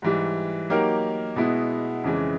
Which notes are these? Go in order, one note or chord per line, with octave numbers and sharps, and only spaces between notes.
G#2 E3 G3
F#3 A#3 D#4 G4 A#4
B2 G#3 B3 E4
F2 C#3 E3 G#3